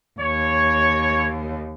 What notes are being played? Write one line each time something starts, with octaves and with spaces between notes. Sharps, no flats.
D#2 C#5